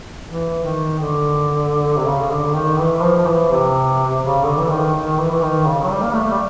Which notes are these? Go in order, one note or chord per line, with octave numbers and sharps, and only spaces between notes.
E3
D#3
D3
C3
C#3
D3
D#3
E3
F3
F3
E3
C3
C#3
D3
E3
D#3
D#3
E3
E3
D#3
C#3
F#3
G3
A#3
A3
G3